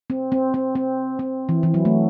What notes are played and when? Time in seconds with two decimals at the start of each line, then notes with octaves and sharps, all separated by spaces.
0.10 C4
0.32 C4
0.54 C4
0.75 C4
1.19 C4
1.49 E3
1.63 E3
1.74 F#3
1.85 A3